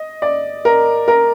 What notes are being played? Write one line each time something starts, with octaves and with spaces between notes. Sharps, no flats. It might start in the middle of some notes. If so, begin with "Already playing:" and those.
Already playing: D#5
D5
A#4
A#4